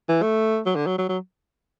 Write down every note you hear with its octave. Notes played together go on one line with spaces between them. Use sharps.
E3
A3
F#3
D3
F#3
F#3
F#3